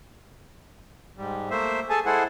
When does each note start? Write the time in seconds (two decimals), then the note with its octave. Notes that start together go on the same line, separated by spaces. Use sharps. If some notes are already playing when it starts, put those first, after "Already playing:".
1.17 G#2 G3
1.50 A3 A#3 C5 E5
1.90 G#4 A4 G#5 A5
2.06 G#3 E4 G#4 A4 C5 F#5